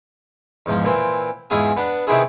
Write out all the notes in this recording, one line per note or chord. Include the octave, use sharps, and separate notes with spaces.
E2 G#2 F3
A#2 E3 C4
E2 G#2 E4 F4 G#4 G#5
B3 D4
C3 D#3 B3 C4 E4 G#4